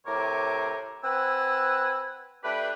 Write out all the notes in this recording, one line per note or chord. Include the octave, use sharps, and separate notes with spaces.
A2 C3 A#4 C#5 D6
C4 B4 F#5 G#5 E6
A3 D4 G4 B4